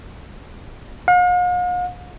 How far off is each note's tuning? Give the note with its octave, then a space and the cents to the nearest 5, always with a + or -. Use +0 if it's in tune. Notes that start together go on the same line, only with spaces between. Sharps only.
F5 +45